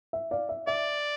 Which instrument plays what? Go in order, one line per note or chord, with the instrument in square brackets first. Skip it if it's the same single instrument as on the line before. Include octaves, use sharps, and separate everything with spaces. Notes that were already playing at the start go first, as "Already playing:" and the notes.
[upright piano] E5
D5 F5
E5
[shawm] D5 [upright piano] E5